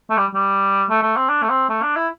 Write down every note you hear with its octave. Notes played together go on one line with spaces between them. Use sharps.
A3
G3
G3
A3
A3
C4
D4
A3
C4
A3
D4
E4